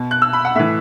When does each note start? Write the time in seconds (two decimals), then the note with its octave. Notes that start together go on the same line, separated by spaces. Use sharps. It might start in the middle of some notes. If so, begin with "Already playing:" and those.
Already playing: B2
0.11 F#6
0.22 E6
0.33 B5
0.45 F#5
0.55 A2 E3 E5